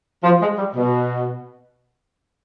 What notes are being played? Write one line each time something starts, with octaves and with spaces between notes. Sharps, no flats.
F3
G#3
G3
B2